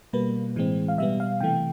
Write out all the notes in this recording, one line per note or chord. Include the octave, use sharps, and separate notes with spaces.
B2 G3 A#3 B4
A2 E3 G#3 C4
F5
B2 G3 B3 E5
F5
C3 E3 A3 G5